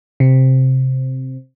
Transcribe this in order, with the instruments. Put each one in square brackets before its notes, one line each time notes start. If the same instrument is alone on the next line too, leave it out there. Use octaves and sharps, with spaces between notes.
[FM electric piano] C3